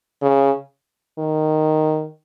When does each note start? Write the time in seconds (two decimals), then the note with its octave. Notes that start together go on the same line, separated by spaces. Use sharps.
0.22 C#3
1.19 D#3